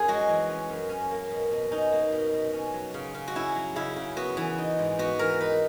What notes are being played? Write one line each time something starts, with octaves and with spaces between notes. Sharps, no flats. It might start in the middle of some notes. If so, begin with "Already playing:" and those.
Already playing: F#2 C#4 G#4
G#3 F#4
E3
C#4
F#2
C#4
A#3
B2
B2
C#4 D#4
A#3
B2
B2
C#4
F#3
C#3
C#3
F#4
C#4 E4
F#3
C#3 E4
C#3
B3 F#4
E3
D#4
G#2
B3 F#4
E3 A#4
D#4 B4